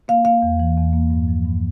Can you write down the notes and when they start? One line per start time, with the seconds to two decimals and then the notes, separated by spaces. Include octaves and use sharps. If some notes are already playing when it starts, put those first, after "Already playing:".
0.08 A#3 F5
0.25 A#3 F5
0.42 E2
0.60 E3
0.77 E2
0.93 A#3
1.10 G2
1.28 F3
1.45 G2